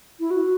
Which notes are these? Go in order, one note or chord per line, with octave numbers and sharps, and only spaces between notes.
E4
F#4